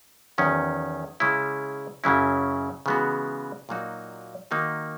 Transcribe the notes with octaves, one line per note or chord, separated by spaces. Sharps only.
E2 D#3 F#3 C#4
C#3 G#3 C#4 E4
F#2 C#3 F#3 C#4 E4
C#3 E3 G#3 B3 F#4
A#2 F#3 A#3 D#4 F#4
D#3 A#3 D#4 F#4